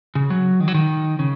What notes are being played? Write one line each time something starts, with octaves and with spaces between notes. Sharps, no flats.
C#3
F#3
D#3
F#3
D#3
C#3